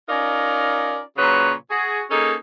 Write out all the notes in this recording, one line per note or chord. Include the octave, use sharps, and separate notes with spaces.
C#4 D#4 F4 A#4 D5
A#2 C#3 F#3 B4 C#5
F#4 G#4
A#3 C#4 D#4 G#4 A4